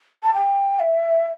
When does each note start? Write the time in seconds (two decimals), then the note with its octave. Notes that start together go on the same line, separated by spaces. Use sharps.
0.23 A5
0.34 G5
0.79 E5